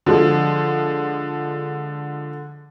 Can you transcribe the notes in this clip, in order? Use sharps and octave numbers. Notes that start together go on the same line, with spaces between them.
D3 F3 G#3